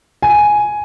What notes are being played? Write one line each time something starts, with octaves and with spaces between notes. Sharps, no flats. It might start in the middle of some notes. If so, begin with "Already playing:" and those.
G#5